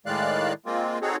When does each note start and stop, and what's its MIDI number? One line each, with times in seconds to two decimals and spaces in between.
0.06 0.53 45
0.06 0.53 51
0.06 0.53 56
0.06 0.53 74
0.06 0.53 77
0.06 0.53 90
0.66 0.99 56
0.66 0.99 58
0.66 0.99 60
0.66 0.99 65
1.02 1.16 60
1.02 1.16 63
1.02 1.16 66
1.02 1.16 68
1.02 1.16 69
1.02 1.16 73